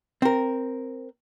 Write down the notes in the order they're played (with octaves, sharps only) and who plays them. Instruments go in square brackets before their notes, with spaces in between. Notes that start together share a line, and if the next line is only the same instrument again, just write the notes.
[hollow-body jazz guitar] C4 A#4